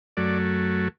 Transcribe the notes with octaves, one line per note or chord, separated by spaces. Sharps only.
F#2 F#3 A3 D5